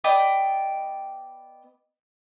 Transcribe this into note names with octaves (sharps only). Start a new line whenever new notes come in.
B3 D5 D#5 G5